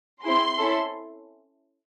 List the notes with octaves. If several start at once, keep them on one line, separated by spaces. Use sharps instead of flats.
C4 E4 G#4 C6
C#4 E4 A4